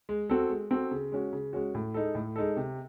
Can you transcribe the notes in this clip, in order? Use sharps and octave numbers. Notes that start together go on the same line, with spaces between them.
G#3
C4 F#4 A4
G#3
C4 F#4 A4
C#3
G#3 C#4 F#4
C#3
G#3 C#4 F#4
A2
G#3 D#4 A4
A2
G#3 D#4 A4
C3